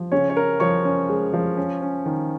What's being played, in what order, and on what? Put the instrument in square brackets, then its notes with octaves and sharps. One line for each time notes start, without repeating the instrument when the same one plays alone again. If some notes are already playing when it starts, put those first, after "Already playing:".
Already playing: [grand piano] F3
C#3 C#4 C#5
C#5
C#4 A#4
F3 C#5 C#6
C#4
G#3
F3
C#4
C#4
D#3